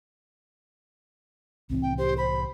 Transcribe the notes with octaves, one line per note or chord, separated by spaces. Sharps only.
C2 A2 E3 C4
G5
G4 C5
C5 B5